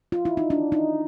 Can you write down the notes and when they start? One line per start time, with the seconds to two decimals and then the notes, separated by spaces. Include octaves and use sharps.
0.12 F4
0.25 E4
0.37 D#4
0.50 D4
0.72 D#4